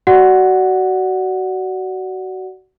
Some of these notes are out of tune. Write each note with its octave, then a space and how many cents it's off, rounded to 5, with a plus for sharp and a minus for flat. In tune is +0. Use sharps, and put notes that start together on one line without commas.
F#4 +25 D5 +0 F#5 +0